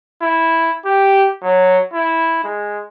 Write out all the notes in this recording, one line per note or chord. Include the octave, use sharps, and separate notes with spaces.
E4
G4
F#3
E4
G#3